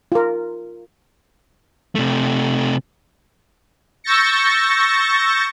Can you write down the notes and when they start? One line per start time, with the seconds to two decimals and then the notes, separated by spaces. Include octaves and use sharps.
0.12 F4 A#4
1.95 C3 A3
4.04 C#6 E6 G6 A6 A#6 C#7